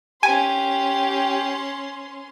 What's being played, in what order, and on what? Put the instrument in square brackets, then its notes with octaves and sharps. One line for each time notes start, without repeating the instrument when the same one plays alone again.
[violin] C#4 C6 [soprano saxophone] G4 [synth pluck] G#5